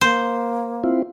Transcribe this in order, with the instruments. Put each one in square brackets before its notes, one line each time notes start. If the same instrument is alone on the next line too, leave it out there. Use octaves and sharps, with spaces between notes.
[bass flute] A#3 [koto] C5
[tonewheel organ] C4 E4 F4